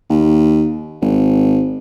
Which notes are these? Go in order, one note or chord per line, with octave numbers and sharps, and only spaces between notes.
D#2
G#1